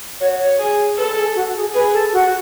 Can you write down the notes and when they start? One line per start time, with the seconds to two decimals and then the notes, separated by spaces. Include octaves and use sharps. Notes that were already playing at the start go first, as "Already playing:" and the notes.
0.20 F#4 C#5
0.39 C#5
0.59 G#4
0.97 A4 B4
1.16 G#4
1.35 F#4
1.55 G#4
1.74 G#4 B4
1.93 A4
2.13 F#4